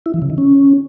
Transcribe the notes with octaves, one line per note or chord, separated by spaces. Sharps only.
E4
E3
C#3
D#3
C#4